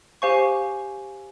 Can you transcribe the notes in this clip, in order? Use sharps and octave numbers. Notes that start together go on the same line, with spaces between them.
G4 C5 F5 G#5 C#6